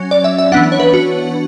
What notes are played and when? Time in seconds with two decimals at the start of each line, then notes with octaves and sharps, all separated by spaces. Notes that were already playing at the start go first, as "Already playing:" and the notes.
Already playing: F#3 C#4
0.11 D5
0.24 E5
0.38 E5
0.52 E3 B3 D4 F#5
0.72 C#5
0.80 B4
0.94 F#4